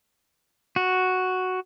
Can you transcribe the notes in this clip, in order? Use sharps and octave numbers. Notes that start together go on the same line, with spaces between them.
F#4